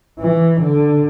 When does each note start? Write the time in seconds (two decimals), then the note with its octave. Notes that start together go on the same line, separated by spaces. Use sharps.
0.20 E3
0.60 D3